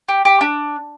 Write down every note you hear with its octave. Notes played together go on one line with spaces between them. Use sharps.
G4
G4
D4